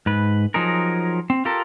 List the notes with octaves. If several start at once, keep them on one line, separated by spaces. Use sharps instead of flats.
G#2 B4
F3 F#3 D#4 G#4 A#4
C4
F4 G4 A4 A#4